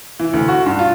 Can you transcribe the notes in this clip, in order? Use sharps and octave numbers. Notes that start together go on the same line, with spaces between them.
E3
D2
F#4
G2
F4